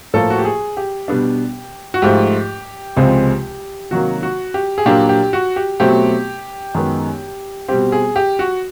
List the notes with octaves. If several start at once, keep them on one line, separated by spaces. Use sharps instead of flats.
A2 F3 A#3 A4
F#4
G4
G#4
G4
B2 G3 B3 D4
F#4
G#2 F3 A3 G4
C#2 C3 F3 G#3 C4
C3 D#3 F#3 A#3 F#4
F#4
G4
G#4
A#2 F#3 A#3 D4 G4
G4
F#4
G4
B2 F#3 A3 C4 G4
F#2 D#3 G#3 B3
B2 G3 C4 G4
G#4
G4
F#4